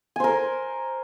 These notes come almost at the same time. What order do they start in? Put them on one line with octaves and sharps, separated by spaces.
G#5 C5 A#4